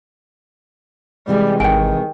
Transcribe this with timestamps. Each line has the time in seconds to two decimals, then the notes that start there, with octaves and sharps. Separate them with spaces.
1.28 C3 E3 G3 G#3
1.60 G#1 D#3 G5 G#5